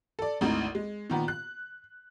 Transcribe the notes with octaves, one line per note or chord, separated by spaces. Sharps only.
A4 D5
G#1 D2 D#4 E4
G#3
A#2 D#3 B3
F#6